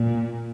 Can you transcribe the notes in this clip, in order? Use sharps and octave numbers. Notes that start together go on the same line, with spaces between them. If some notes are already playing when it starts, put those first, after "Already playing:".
Already playing: A#2